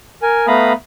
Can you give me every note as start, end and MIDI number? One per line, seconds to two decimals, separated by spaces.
0.22 0.46 70
0.22 0.46 80
0.47 0.73 57
0.47 0.73 59
0.47 0.73 77
0.47 0.73 82
0.47 0.73 83
0.47 0.73 87